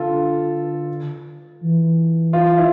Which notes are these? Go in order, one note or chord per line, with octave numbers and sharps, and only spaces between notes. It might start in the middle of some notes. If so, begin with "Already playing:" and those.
Already playing: D3 F4 A4
E3
F4
E4